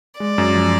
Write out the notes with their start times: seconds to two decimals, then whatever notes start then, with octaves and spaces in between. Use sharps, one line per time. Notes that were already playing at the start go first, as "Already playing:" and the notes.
0.20 G#3 D5
0.38 F#2
0.55 F3